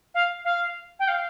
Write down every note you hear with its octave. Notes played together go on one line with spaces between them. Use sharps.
F5
F5
G5
F5